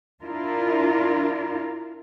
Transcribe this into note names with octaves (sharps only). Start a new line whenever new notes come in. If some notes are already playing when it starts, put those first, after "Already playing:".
D4 E4 F4 A#4